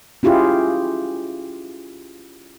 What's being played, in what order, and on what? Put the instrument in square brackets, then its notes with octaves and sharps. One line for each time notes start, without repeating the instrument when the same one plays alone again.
[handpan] C#4 E4 F4 G4 G#4